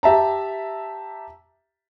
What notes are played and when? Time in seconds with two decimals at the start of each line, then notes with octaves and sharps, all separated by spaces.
0.03 G4 E5 A5 A#5